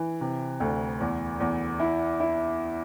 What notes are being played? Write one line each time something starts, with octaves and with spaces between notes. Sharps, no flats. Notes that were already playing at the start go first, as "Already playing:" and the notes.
Already playing: E3
C3
D2
E2
E2
E4
E4